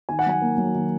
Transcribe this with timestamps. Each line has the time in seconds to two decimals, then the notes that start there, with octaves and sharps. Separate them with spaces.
0.09 D#3 G#5
0.19 F#5
0.26 F#3 G#5
0.42 A#3
0.58 F#3
0.75 D#3